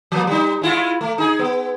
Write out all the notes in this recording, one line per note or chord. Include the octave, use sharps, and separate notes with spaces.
F3 A#3
G3 D#4
G#3 E4 F4
A3
D#4 G#4
B3